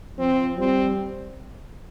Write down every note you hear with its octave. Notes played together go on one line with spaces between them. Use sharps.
F3 C4
G3 C4